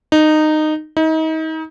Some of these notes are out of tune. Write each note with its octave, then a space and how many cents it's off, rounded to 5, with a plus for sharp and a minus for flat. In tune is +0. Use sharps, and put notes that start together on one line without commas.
D#4 -15
D#4 +35